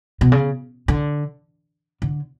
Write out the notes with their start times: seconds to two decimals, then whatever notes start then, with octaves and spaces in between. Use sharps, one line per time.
0.21 B2
0.32 C#3
0.88 D3
2.02 D3